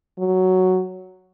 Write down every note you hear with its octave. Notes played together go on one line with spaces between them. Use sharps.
F#3